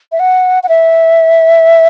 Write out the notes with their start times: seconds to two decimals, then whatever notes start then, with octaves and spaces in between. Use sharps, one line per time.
0.12 E5
0.19 F#5
0.63 F#5
0.69 E5